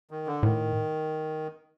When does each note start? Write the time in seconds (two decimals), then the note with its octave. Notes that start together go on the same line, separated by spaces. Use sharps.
0.11 D#3
0.27 D3
0.43 A2 D#3